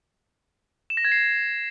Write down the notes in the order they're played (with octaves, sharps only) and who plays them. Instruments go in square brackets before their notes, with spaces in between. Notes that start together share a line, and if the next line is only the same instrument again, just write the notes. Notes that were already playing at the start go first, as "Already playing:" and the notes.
[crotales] E7
A#6
G#6
C7